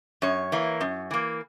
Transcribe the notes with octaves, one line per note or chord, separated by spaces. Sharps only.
F#2 C#5
E3 A#3
F#2
E3 A#3